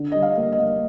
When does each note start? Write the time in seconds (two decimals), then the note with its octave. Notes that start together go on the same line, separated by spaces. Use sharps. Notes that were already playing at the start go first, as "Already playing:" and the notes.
Already playing: D3
0.12 G3 D#5
0.22 F5
0.37 A#3
0.52 D#5
0.60 A#3